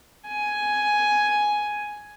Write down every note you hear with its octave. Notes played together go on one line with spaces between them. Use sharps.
G#5